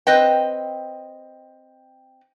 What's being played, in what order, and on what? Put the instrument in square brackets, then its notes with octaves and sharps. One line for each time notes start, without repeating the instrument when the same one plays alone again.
[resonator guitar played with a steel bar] C4 B4 D#5 G5